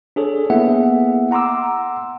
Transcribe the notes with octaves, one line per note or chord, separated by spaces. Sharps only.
D4 G#4 A4 C#5
A#3 B3 E4 G#4 E5 F#5
F#5 A#5 C6 D6 E6